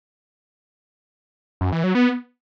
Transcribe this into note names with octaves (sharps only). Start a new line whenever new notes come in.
F#2
E3
F#3
B3